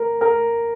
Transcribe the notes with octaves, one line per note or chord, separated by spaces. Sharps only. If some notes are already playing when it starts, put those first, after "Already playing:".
Already playing: A#4
A#4